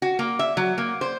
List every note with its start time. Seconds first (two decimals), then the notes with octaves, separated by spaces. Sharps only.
0.02 F#4
0.19 A#3
0.39 E5
0.57 F#3
0.78 A#3
1.01 C5